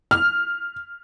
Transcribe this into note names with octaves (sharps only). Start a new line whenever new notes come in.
F6